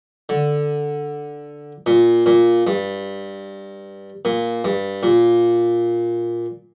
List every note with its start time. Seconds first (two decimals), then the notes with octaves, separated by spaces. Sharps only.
0.29 D3
1.86 A#2
2.26 A#2
2.67 G2
4.25 A#2
4.64 G2
5.03 A#2